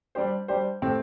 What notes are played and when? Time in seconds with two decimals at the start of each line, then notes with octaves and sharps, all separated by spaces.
0.15 G3 D4 G4 C5
0.48 G3 D4 G4 C5
0.82 A2 A3 C4 G4